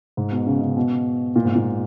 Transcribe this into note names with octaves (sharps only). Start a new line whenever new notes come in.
G#2
B2
C#3
C#3
B2
A#2
G#2
A#2